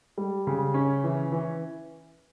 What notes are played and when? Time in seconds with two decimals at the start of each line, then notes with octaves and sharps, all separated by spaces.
0.18 G3
0.47 C#3
0.74 C#4
1.04 E3
1.32 E3